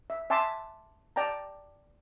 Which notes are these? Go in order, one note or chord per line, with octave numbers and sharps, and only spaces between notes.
E5
E5 G#5 A5 C6 D6
D5 G5 A5 A#5